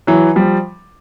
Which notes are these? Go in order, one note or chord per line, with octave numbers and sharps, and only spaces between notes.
E3 F#3
F3 G3